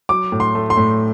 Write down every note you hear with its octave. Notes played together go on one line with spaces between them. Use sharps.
F#3 D6
A2
C6
A3
C6
A2